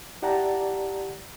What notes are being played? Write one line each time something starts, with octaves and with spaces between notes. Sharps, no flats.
E4 G4 D5 F#5 A5 A#5